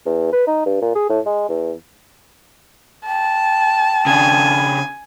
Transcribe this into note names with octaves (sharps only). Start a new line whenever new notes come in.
E2
B4
D#4
G2
A#2
G#4
A2
G#3
E2
G5 A5
C#3 D4 G#5